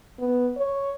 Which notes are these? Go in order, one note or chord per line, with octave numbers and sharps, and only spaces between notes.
B3
C#5